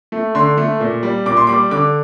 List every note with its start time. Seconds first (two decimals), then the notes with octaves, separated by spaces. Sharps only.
0.12 A3
0.35 D3 C6
0.57 A3
0.80 A#2
1.03 G3
1.26 A#2 D6
1.37 C6
1.47 G3 D6
1.71 D3 D6